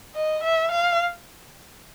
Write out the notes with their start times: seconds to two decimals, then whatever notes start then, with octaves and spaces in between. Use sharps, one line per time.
0.15 D#5
0.44 E5
0.72 F5